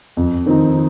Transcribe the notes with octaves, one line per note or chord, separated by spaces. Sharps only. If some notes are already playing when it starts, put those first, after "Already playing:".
F2
D#3 C4 D#4